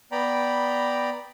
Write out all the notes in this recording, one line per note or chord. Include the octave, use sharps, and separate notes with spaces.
B3 D5 G5 A#5 B5